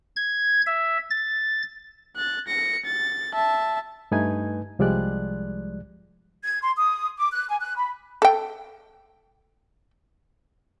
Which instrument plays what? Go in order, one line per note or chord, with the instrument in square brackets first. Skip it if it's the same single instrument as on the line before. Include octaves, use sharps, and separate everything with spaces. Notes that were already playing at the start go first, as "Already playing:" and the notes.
[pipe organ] G#6
E5
A6
[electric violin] F#6 A6
A#6 C#7
A6
E5 A5
[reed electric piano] G2 A3 D#4 B4 G#5 G#6
C2 F3 G3 G#3 D5 F#6
[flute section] G#6
C6
D#6
D6
F#6
G#5
F#6
B5
[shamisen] A4 G5